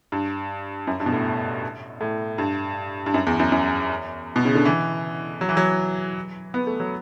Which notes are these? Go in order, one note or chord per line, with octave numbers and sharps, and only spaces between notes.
G2
F#2
G2
B2
A2
A2
G2
G2
F#2
E2
F#2
F#2
B2
C#3
D3
E3
F#3
E3
F#3
B3
A3
F#3